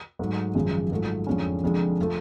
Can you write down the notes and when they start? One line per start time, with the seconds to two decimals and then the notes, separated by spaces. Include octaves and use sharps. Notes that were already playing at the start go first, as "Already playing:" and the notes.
0.19 G#2 F#3 A3
0.55 G#1 F#2 C#3 F3 G#3
0.91 G#2 F#3 A3 F4
1.27 F2 D3 F3 G#3 C#4
1.63 F1 F2 D3 G#3
2.01 F3 A3